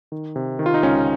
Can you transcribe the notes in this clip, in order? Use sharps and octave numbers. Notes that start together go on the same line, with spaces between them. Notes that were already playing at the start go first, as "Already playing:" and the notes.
D#3
C3
D#3
F4
D#4
C#2 C#4